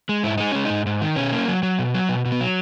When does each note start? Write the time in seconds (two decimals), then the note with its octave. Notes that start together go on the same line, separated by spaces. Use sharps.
0.09 G#3
0.23 G#2 E4
0.38 G#3 D#4
0.52 G#3 C#4
0.65 G#2 D#4
0.86 G#2
1.02 D#3
1.16 B2 C#4
1.32 A#3
1.48 F#3
1.63 F#3
1.79 B2
1.94 F#3
2.09 B2
2.25 B2
2.32 B3
2.40 F#3